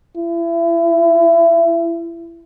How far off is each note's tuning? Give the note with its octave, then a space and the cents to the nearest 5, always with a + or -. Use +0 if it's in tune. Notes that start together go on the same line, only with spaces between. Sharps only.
E4 +30